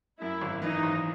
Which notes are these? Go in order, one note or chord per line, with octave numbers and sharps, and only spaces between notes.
F#2 E4
G#1
E3 D#4
G#1